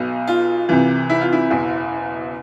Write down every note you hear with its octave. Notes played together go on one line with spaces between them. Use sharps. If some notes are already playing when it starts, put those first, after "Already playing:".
Already playing: B1 B2
F4
C2 C3 E3
E4
F4
E4
F#1 E2 B2